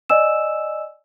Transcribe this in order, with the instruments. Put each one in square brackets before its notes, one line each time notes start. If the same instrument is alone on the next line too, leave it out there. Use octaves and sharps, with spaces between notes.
[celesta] D5 D#5 G#5 E6 E7